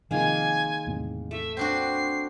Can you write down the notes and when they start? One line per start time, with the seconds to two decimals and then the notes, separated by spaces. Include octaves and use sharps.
0.11 C3 D#3 F3 G#3 A#3 G#5
0.87 E2 A2 C3
1.31 A3 E5
1.57 C4 D4 F#4 C7